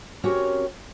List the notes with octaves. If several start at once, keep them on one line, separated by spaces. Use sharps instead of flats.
C4 C#4 F#4 G4 A#4 C#5